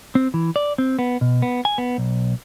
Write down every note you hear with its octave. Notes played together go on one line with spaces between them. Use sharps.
C4
E3
D5
C4
B3
B2
B3
G#5
B3
B1